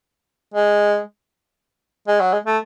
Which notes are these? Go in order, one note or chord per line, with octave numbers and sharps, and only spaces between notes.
G#3
G#3
F#3
G#3
A3